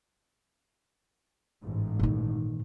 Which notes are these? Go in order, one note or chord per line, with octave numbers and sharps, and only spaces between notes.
A1 G#2
A#2 D#3